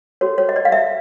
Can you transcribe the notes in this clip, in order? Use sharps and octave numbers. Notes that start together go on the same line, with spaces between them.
F#4 A4 C#5
C#5
D#5
D5
F5
E5